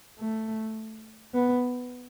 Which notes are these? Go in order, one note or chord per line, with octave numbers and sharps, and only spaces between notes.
A3
B3